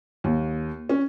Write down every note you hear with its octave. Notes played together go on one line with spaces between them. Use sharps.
D#2
C#4